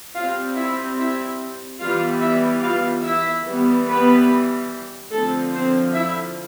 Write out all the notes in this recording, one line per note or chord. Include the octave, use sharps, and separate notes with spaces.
G3 C4 F4 F5
E4 E5
E4 E5
E3 G3 B3 F4 F5
E4 E5
F4 F5
E4 E5
E3 G3 B3
B3 B4
D3 F3 A3 C4 A4
C4 C5
E4 E5